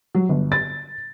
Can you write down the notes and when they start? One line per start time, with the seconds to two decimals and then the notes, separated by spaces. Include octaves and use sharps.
0.15 F#3
0.29 G1
0.52 A6